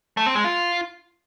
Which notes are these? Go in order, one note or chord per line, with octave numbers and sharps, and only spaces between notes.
A3
C4
G#3
F4